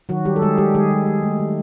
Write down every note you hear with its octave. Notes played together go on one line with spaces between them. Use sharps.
D#3 F#3 F#4
D#3 G3 G4
A4
D#3 G#3 G#4
G3 G#3 G4
D#3 G#3 G#4
G#3
G#3
A3
D#3